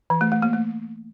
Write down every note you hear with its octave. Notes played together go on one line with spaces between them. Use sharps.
E3
A3
A3
A#3
A3